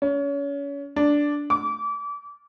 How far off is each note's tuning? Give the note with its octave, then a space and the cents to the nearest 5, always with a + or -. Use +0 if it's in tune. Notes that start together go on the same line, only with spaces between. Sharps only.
C#4 +30
D4 -5
D6 -30